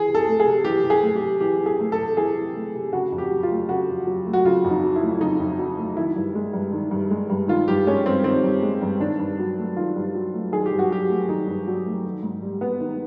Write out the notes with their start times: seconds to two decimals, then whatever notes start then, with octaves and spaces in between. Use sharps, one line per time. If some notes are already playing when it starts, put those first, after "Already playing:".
Already playing: E3 G#4
0.08 C3
0.15 A4
0.28 A3
0.40 G#4
0.46 C3
0.65 E3 G4
0.84 C3
0.90 G#4
1.02 A3
1.15 G4
1.22 C3
1.40 E3 G4
1.59 C3
1.66 G#4
1.80 A3
1.92 A4
1.99 C3
2.17 E3 G#4
2.35 C3
2.56 A3
2.75 C3
2.93 C#3 F#4
3.12 F2
3.18 G4
3.31 F#3
3.43 F4
3.51 A3
3.68 C#3 F#4
3.88 F2
4.07 F#3
4.26 A3
4.33 F#4
4.45 C#3 F4
4.64 F2
4.70 D#4
4.83 F#3
4.96 E4
5.02 A3
5.20 C#3 D#4
5.40 F2
5.58 F#3
5.78 A3
5.97 D#3 E4
6.16 G2
6.35 G#3
6.53 G2
6.73 D#3
6.91 G2
7.11 G#3
7.30 G2
7.48 D#3 F4
7.68 G2 G4
7.87 G#3 C#4
8.05 G2 C4
8.24 D#3 C4
8.43 G2
8.63 G#3
8.82 G2
9.00 D#3 D4
9.19 G2
9.39 F#3
9.58 A3
9.76 D#3 F4
9.96 G2
10.15 F#3
10.34 A3
10.52 D#3 G#4
10.66 G4
10.72 G2
10.79 F#4
10.91 F#3 G4
11.09 A3
11.28 D#3 D#4
11.47 G2
11.67 F#3
11.86 A3
12.05 D#3
12.23 G#2
12.42 G3
12.61 B3
12.80 D#3